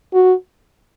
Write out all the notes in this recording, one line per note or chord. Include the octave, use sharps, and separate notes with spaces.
F#4